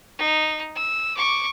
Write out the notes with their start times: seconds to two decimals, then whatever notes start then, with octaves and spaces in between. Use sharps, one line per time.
0.18 D#4
0.75 E6
1.17 C#6 D6